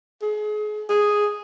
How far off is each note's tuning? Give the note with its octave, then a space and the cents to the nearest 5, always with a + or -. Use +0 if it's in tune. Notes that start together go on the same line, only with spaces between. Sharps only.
G#4 +30
G#4 +0